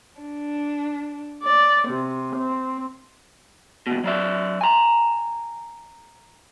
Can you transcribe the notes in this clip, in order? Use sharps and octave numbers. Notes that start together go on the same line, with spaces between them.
D4
D5
C3
C4
D#2 B2
F#3 D5 E5
G#5 A#5